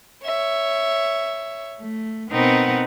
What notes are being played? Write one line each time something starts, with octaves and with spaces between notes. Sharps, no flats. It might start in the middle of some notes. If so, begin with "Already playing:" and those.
C#5 E5
A3
B2 B3 C4 D#4 A#4 F#5